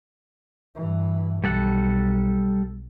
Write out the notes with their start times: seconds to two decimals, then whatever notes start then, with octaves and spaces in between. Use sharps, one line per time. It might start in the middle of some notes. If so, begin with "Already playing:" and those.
0.75 G2 E3
1.44 B1 G3 A4 F#5